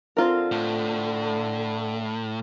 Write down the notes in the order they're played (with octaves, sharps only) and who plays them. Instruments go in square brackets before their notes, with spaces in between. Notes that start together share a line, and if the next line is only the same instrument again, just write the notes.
[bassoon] D3 [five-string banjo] C4 F4 A#4
[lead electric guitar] A2